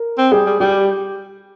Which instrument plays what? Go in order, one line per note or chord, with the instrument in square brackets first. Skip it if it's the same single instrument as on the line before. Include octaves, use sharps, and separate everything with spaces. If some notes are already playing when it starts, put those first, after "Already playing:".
Already playing: [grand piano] A#4
[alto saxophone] C4
[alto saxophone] G3 [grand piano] G#4
[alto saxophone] G3
[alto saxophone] G3 [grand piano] G4